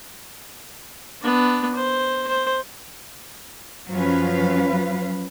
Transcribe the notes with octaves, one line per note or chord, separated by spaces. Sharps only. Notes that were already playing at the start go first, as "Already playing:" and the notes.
B3 D4
C5
C5
F#2 F3 F#3 C#4 B4 F5